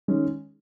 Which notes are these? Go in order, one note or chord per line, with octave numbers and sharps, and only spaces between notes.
D#3 G#3 C#4